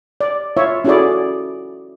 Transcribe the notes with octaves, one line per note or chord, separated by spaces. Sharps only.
D5
F4 C#5 E5
C#4 E4 F#4 G#4 A4 D5